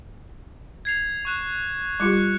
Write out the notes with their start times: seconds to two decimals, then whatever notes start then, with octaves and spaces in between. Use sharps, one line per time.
0.85 G#6 C7 F7
1.25 C#6 F#6 E7
2.00 G3 F4 G4 F#6 C#7